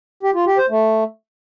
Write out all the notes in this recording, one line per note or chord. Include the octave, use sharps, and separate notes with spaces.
G4
F4
G4
C5
A3